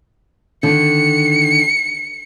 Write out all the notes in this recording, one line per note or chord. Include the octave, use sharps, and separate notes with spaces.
D3 D#3 C#7